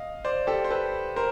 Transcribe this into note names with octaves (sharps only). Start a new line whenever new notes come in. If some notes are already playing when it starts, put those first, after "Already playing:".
Already playing: D#5 F5
C5 D5
G4 A4
C5
A4 B4
A#4 C5